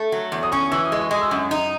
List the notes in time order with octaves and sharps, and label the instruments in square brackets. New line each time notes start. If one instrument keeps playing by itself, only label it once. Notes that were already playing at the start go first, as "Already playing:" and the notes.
Already playing: [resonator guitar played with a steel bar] A3
F#3
E2
[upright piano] D#6
[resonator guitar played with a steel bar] C#4 [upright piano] C#6
[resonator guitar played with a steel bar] E3 [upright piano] E6
[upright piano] D#6
[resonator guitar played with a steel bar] G#3
[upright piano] C#6
[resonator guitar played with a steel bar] G#3 [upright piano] D#6
[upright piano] E6
[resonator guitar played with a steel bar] F#2 [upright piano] D#6
[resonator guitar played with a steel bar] D#4